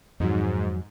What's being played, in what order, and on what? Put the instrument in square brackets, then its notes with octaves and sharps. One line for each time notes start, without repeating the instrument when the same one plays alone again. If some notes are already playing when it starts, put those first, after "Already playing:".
[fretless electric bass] F2 D#3 F#3 [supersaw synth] G#2